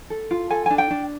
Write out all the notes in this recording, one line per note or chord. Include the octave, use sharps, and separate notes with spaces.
A4
F4
A4 G#5
D4 G#5
G5
D4